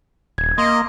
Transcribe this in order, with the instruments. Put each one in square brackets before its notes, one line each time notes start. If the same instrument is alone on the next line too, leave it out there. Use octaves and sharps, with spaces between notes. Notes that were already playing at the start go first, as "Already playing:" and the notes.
[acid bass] D#1 [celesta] G#6
[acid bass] A#3 [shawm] D#5 [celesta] C6